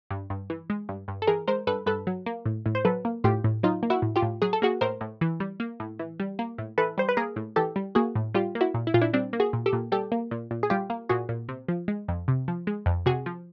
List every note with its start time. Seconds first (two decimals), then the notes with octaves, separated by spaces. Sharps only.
0.11 G2
0.30 G2
0.50 E3
0.70 G#3
0.89 G2
1.08 G2
1.22 A4
1.27 E3 G#4 A#4
1.48 G#3 A#4 C5
1.67 G2 A4 B4
1.86 G2 A4 B4
2.07 F#3
2.26 A#3
2.46 A2
2.66 A2
2.75 C5
2.85 F#3 A4 B4
3.05 A#3
3.24 A2 F4 G4
3.44 A2
3.63 F#3 D#4 F4
3.83 A#3
3.90 E4 F#4
4.02 A2
4.16 F4 G4
4.22 A2
4.42 F#3 G#4
4.53 A4
4.62 A#3 F#4 G#4
4.81 A2 A#4 C5
5.01 A2
5.21 E3
5.40 G3
5.60 A#3
5.80 A2
5.99 E3
6.20 G3
6.39 A#3
6.58 A2
6.78 E3 A4 B4
6.98 G3 C5
7.09 B4
7.17 A#3 G#4 A#4
7.36 A2
7.56 E3 G4 A4
7.76 G3
7.95 A#3 F#4 G#4
8.15 A2
8.34 G3 F4 G4
8.55 A#3
8.61 E4 F#4
8.74 A#2
8.87 E4
8.94 A#2 F4
9.02 D4 E4
9.13 G3 C4 D4
9.33 A#3
9.40 F#4 G#4
9.53 A#2
9.66 G4 A4
9.73 A#2
9.92 G3 G4 A4
10.12 A#3
10.31 A#2
10.51 A#2
10.63 G#4
10.70 G3 F4 G4
10.90 A#3
11.09 A#2 F#4 G#4
11.29 A#2
11.49 C3
11.68 F3
11.88 G#3
12.08 F2
12.28 C3
12.48 F3
12.67 G#3
12.86 F2
13.06 C3 F#4 G#4
13.26 F3